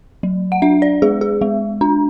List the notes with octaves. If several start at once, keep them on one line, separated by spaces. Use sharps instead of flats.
F#3
F#5
D4 E5
D5
G#3 G#4
G#4
G#3
D4